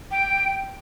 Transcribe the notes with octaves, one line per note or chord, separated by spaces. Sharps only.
G5